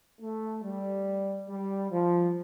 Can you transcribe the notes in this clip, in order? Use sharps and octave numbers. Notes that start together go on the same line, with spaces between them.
A3
G3
G3
F3